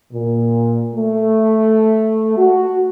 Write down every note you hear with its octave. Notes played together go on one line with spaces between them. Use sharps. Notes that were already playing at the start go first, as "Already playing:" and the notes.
A#2
A3
F#4